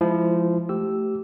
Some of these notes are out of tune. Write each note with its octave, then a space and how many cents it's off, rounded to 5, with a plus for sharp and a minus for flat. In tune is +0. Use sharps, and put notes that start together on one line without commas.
F3 -15 G#3 +0 E4 +0
A3 +0 G4 -20 E6 +0